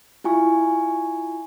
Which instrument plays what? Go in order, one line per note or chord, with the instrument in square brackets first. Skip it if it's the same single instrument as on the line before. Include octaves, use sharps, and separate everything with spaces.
[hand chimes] E4 F4 G#5 C#6